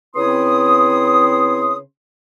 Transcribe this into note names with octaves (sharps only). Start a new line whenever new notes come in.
C#3 B3 C4 E4 C6 D#6